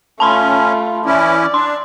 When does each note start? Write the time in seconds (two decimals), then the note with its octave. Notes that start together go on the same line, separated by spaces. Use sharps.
0.20 A3 C#4 F4 A5 B5 C6
1.06 E3 C#4 E4 D5
1.54 D4 C6